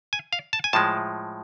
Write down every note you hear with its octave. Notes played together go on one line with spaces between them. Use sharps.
G#5
F5
A5
G#5
A2 F3 G#3 A5